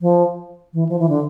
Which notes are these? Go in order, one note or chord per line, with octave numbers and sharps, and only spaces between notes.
F3
E3
F3
E3
D3